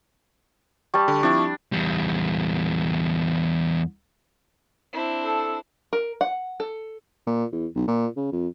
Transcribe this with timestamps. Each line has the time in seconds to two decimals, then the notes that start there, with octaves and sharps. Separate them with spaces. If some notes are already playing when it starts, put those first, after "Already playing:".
0.94 G3 A5 C#6
1.08 D3
1.23 F3 C4 D4 E4
1.72 E2 G3
4.93 C4 D4 E4
5.25 A4
5.93 A#4
6.21 F#5
6.60 A4
7.27 A#2
7.52 E2
7.76 B1
7.88 A#2
8.17 C#3
8.32 F2